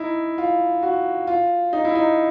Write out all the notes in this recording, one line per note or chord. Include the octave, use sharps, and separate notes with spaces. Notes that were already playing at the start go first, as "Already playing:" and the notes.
Already playing: D#4 E4
F4
F#4
F4
D#4
E4
D#4